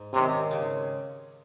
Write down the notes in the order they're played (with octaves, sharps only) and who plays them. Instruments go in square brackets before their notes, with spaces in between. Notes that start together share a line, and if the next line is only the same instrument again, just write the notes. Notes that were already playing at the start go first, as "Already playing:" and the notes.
Already playing: [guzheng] G#2
[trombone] C3 [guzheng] D#3 G#3 C#4
[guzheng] C#3